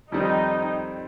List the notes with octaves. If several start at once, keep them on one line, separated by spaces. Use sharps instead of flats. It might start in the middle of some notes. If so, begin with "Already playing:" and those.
F2 D#3 G3 C4 D#4